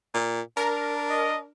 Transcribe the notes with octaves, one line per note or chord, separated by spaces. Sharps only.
A#2
D4 A#4
D#5